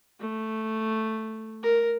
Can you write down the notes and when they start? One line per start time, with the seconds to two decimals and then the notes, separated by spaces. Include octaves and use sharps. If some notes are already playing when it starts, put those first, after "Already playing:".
0.20 A3
1.63 A#4